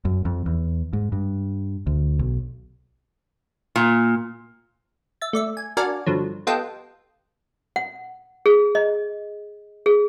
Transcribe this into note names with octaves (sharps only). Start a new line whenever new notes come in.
F#2
F2
E2
G#2
G2
D2
B1
A#2
E5 A6
A3 D5 E5
G#5
D4 F#4 A#4 D5 F5 G#5
G2 D3 F3 F#3
B3 F4 G4 A4 D#5 G5
F#5
G#4
D#5
G#4